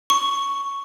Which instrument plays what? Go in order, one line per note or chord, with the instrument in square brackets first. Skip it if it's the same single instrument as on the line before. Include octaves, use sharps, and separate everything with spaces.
[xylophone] C#6